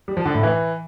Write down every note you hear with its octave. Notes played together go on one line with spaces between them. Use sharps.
G3
F3
D3
A2
E3